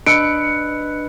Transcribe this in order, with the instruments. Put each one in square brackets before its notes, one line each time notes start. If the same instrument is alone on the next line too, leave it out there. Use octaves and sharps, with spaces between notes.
[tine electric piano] D4 D#5 E6 [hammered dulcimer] B4 [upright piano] C#7 [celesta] D7